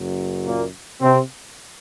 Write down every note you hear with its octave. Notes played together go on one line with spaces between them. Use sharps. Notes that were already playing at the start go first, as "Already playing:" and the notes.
Already playing: F#1 F#2 F#3
A#2 A#3
C3 C4